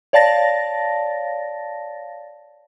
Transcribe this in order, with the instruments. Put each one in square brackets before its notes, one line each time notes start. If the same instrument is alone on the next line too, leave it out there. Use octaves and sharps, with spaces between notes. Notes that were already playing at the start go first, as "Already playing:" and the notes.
[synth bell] C#5 D5 F5 A5 A6 A#6